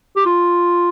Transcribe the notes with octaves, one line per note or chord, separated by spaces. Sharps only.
G4
F4